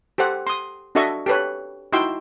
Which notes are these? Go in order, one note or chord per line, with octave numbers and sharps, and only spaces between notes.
G4 A4 C5 F#5
C6 D#6
D4 F#4 A4 D#5 E5 C#6
G4 A4 B4 C#5
D#4 E4 F#4 G5 C6 E6